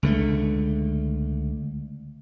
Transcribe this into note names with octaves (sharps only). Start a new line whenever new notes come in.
C#2 D3 A3